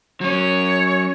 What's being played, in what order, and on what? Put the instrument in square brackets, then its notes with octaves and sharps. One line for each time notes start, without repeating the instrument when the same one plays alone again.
[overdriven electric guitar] F#3 C#4 [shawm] C#5